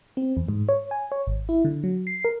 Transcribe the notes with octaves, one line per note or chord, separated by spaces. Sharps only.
C4
E2
G#2
C#5
G#5
C#5
G#1
E4
D3
F#3
C7
A#4